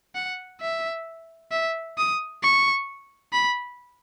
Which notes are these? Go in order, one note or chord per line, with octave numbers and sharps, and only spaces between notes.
F#5
E5
E5
D#6
C#6
B5